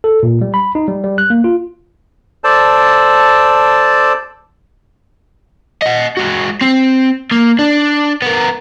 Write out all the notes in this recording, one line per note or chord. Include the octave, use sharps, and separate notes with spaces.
A4
A#2
G3
B5
D#4
G3
G3
F#6
A#3
F4
A4 C5 D5 A5
D#5 F#5
G#3 F#4
C4
A#3
D4
B3 A#4